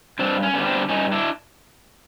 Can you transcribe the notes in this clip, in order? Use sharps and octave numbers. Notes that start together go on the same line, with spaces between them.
G2 C4 D4
C#4
D3 G3 B3
C4 D4
G2 C#4 D#4
D4 E4